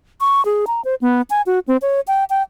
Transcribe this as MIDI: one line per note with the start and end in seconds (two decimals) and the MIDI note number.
0.21 0.44 85
0.45 0.65 68
0.67 0.81 82
0.85 0.95 72
1.01 1.22 59
1.30 1.42 80
1.46 1.59 66
1.68 1.77 60
1.82 2.00 73
2.08 2.24 79
2.30 2.42 79